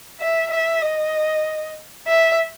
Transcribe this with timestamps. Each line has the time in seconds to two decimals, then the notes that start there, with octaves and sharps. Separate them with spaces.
0.20 E5
0.51 E5
0.82 D#5
2.06 E5